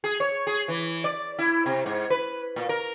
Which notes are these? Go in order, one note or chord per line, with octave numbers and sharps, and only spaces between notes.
G#4
C#5
G#4
E3
D5
E4
C3
G#2
B4
A#2
A#4